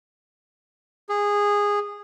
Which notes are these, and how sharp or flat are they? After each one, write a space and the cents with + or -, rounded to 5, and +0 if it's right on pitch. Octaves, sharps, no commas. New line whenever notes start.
G#4 -15